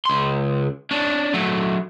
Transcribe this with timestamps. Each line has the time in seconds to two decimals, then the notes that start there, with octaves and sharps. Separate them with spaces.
0.05 C#2 C6
0.91 C#4 D4
1.34 F#3 A3